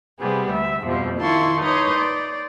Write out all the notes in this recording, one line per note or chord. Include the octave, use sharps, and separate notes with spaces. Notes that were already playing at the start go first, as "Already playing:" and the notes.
C3 G3 B3 G#4
D2 E5
F2 B2 F3 G3
D#3 E4 F4 A5 C6 C#6
D#4 B4 C#5 D#5 C6 D6
D5